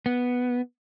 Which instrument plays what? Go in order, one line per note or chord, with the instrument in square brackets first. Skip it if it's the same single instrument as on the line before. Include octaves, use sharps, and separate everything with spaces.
[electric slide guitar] B3